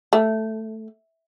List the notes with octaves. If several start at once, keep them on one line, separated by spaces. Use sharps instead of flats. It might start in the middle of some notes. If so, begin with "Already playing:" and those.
A3